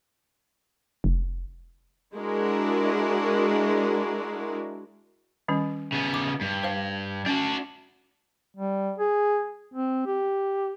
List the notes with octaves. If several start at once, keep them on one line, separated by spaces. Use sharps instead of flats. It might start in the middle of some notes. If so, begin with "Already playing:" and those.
F1
G#3 D4 E4 F#4 G#4 A#4
D#3 G3 C#4
C#3 B3
D6
G2
C5 F5
C#4 D4 F#4
G3
G#4
C4
G4